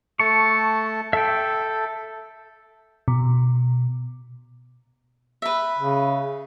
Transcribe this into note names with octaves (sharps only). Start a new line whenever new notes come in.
A3 A5 C#6
A4 E5 G5
B2
B4 E5
C#3